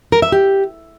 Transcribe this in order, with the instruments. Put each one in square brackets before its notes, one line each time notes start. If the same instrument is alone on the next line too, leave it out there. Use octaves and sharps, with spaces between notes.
[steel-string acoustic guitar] A#4
E5
G4